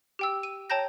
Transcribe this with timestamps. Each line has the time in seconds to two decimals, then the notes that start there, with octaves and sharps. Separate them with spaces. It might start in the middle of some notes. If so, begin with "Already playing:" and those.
0.19 G4 G5 E6
0.43 D#7
0.70 C#5 G5 A5 A#5 G6 A#6